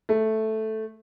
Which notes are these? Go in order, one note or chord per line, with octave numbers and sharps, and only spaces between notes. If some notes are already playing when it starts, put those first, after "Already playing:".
A3